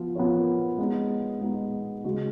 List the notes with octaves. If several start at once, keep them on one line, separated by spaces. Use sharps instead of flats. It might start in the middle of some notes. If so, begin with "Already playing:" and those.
Already playing: F3 B3 F4
F3 B3 F4 A#4 C#5
G#3 B3 D#4
G#3 B3 D#4
C#3 G#3 D#4 F#4